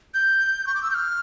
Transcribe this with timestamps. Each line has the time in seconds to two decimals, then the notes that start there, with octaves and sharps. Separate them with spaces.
0.14 G6
0.67 C#6
0.75 D6
0.83 E6
0.91 G6
0.94 F6